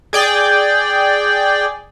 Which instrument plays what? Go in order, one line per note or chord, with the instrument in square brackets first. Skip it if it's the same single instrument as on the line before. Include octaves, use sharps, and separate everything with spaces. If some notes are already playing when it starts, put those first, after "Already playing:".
[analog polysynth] G#4 D5 G5